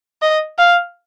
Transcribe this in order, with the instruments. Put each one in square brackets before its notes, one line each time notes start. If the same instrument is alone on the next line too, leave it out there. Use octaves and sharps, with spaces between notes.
[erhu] D#5
F5